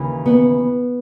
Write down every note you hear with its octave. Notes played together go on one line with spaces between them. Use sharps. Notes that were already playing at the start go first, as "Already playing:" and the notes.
Already playing: D#2 C#3 E3
B3